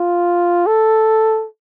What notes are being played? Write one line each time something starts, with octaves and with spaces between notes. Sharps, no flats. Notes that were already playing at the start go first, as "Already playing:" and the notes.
Already playing: F4
A4